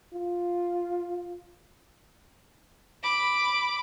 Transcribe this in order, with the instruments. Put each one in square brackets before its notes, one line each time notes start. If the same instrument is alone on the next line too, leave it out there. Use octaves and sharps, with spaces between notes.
[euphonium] F4
[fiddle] B5 D6